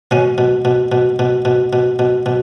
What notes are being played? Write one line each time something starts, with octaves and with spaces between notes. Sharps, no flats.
B2 C#4
B2
B2
B2
B2
B2
B2
B2
B2